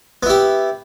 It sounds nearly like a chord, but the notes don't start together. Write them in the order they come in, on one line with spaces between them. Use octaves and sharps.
B3 E4 G4